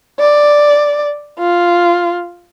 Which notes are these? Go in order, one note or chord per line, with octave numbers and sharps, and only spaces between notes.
D5
F4